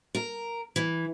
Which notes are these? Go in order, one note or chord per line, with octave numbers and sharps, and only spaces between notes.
A#4
E3